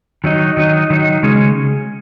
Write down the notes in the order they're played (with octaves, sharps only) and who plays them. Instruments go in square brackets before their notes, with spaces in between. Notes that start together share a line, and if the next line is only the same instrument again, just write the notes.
[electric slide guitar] D#3 F#3 D#4
D#3 F#3 D#4
D#3 F#3 D#4
C#3 G#3 C#4 G#4